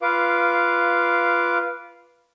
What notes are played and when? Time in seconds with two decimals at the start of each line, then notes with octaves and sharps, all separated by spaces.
0.02 F4 B4 F5 D6